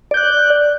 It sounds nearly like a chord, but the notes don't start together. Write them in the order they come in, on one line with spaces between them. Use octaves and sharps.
D5 G6 F#6